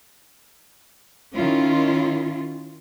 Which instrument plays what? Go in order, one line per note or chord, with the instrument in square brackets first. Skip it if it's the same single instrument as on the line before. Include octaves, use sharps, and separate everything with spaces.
[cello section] D#3 C#4 E4 F4